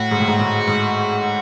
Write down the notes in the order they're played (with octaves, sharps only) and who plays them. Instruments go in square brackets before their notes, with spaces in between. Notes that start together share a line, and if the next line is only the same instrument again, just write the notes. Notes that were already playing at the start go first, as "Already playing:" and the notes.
Already playing: [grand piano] A2 [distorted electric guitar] F#4
[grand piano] G#2
A2
G#2
A2
G#2